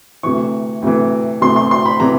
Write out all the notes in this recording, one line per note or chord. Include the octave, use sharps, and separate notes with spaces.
D2 C3 E3 C#6
D2 C3 E3
D2 C3 E3 C6
C6
C6
B5
C3 E3 A#5